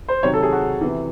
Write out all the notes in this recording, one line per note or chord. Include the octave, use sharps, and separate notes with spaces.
C5
C3 D#3 F#3 C#5
A4
G#4
F#4
C3 E3